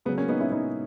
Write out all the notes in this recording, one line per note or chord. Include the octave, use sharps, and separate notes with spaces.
C#3 F#3 B3
A#3 C#4
B3 D#4
C#4 E4
B3 D#4